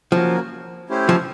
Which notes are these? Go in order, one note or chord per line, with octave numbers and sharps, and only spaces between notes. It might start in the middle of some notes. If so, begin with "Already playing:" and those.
F3 A#3 C#4 F#4 A#4
A3 C#4 E4 G4 C5
F3